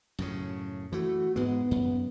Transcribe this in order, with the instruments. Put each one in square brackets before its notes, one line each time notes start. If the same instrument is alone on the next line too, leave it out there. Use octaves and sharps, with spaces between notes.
[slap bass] F#2 A2 C#3
[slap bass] E3 A3 [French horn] F#4
[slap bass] G#2 G#3 [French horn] B3
[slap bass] F#2